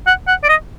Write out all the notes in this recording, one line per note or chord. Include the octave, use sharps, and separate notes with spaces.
F#5
F#5
D5
D#5